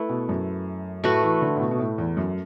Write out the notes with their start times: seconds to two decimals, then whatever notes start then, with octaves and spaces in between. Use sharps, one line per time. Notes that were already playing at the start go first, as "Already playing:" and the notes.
Already playing: A3 E4 B4
0.09 B2
0.29 F#2
1.04 A2 A3 F#4 B4
1.23 E3
1.42 D3
1.56 A2
1.60 B2
1.71 B2
1.79 A2
1.98 E2
2.17 F#2